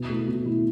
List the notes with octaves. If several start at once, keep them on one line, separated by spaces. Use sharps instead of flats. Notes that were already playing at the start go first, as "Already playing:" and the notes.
Already playing: B2
A3 E4
B2
A3 E4